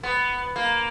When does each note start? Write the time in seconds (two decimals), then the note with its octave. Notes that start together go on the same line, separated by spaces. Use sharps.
0.03 B3
0.56 A#3